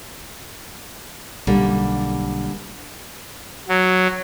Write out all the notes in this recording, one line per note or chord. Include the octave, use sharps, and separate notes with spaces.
B1 D3 G3 A#3
F#3